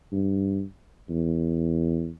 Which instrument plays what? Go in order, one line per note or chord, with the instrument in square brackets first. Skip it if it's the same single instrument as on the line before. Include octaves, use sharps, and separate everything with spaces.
[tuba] G2
E2